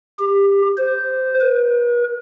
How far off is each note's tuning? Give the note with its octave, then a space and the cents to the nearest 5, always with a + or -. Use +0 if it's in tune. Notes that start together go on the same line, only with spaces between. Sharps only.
G4 +20
C5 -10
B4 -45